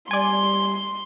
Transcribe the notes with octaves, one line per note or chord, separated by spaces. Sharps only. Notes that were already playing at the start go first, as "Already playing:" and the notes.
G3 D5 G#5 C6